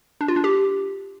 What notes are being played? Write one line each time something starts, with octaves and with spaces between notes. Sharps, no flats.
D4
F4
D4
G4